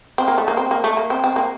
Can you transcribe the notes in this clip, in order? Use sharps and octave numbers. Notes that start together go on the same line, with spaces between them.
C4
A#3
A3
A#3
C4
A#3
A3
A#3
C4
C4
A#3